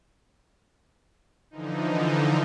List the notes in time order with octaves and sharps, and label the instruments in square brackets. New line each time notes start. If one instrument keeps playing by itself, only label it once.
[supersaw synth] D3 E3 F3 D#4